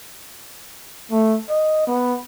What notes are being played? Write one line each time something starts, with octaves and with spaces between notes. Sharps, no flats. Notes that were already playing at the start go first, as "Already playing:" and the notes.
A3
D#5
B3